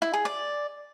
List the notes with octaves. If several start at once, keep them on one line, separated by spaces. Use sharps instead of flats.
E4
G#4
D5